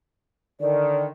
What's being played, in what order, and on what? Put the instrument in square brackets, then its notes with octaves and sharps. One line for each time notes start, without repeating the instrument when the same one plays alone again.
[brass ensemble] D3 D#3 [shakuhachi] D5